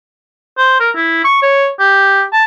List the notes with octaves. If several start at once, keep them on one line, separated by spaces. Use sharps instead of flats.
C5
A#4
E4
C#6
C#5
G4
A5